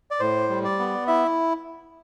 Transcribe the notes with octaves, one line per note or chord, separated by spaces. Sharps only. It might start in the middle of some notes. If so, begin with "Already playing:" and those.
D5
A2 C5
G3
D5
B3
E4 E5